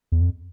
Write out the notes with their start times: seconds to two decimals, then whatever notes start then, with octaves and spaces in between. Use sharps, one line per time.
0.12 E2
0.21 F2